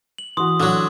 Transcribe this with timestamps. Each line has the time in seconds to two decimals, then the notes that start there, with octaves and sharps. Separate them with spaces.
0.18 F#7
0.37 E3 F#4 C6 D#6 F#7
0.60 D3 F#3